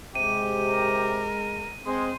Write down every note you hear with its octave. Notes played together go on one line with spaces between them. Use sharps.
C3 G#3 G4 D#7
A#4
G#3 C4 C5